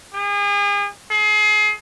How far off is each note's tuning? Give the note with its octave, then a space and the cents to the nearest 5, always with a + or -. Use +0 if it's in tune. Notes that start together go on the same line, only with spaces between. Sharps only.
G#4 -40
G#4 +35